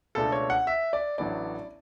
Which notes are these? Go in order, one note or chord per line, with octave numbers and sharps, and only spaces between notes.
C#2 B2 A3 D4 A4
C#5
F#5
E5
D5
A1 A2 F#3 B3 D4 D5